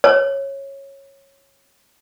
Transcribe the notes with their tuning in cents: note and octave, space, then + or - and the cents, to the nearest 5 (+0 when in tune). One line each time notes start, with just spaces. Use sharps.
C#5 -15